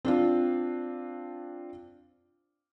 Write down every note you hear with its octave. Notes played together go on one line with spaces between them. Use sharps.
C4 D4 F4